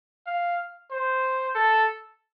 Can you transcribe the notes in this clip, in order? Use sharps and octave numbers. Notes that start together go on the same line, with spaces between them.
F5
C5
A4